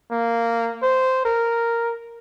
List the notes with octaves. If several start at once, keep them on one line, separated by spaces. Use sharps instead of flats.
A#3
C5
A#4